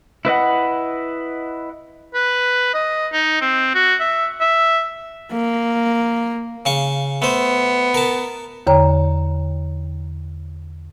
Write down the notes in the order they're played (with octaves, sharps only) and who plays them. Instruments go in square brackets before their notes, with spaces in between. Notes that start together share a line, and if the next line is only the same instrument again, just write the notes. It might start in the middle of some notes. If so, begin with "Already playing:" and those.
[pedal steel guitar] E4 B4 D#5 F#5
[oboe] B4
D#5
D#4
C4
F#4
E5
E5
[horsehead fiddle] A#3
[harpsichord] C#3 F5 C#6
[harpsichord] A3 C5 [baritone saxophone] B3
[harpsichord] A#4 A5
[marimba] E2 D3 C#5 G5 A#5